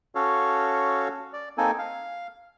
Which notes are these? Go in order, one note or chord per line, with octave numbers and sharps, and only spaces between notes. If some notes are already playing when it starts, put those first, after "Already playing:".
C#4 F#4 A4 C#5 F5
D5
A#3 C4 D#4 A4 G#5
F5